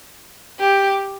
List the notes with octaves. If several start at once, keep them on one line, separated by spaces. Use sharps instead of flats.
G4